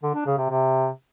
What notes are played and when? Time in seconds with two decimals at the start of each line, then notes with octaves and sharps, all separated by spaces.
0.03 D3
0.14 D4
0.26 C#3
0.38 C3
0.49 C3